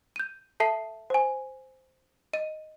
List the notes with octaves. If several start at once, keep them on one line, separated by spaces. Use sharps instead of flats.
G6 D#7
A4 E5 A5 C7
C5 G#5
D#5 D#7